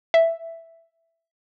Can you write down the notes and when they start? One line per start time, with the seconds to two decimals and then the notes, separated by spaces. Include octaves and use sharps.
0.14 E5